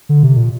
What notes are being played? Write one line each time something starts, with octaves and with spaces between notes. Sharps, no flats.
D3
C3
A#2